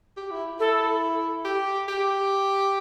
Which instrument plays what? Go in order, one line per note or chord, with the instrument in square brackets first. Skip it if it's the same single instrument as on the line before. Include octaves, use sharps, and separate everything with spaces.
[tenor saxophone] G4
E4
[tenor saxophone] E4 [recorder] A4
[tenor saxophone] G4
G4